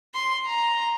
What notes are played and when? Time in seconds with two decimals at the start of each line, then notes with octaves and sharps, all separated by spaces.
0.14 C6
0.46 A#5